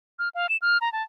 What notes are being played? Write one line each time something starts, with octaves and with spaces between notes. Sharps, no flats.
F6
F5
E7
F6
A#5
A5